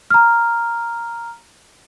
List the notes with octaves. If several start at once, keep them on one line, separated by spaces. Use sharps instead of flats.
A#5 F6